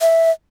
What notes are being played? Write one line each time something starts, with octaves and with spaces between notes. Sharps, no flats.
E5